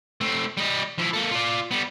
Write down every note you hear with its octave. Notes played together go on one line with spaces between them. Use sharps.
A3 C4
G3 D#5
F3 E4
A#3 A4
F4 D5
G3 B3